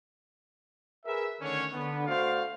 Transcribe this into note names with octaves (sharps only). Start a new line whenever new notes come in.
G#4 A#4 B4 E5
D3 D#3 A3 C#4 D4 C#5
D3 B3
A3 F#4 C5 D5 F5